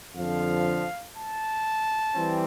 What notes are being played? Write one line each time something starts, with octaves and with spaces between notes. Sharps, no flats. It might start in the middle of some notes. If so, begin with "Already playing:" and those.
F2 D3 F3 F5
A5
E3 G3 C4